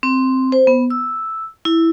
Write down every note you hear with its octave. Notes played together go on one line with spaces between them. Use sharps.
C4
C5
B3
E6
E4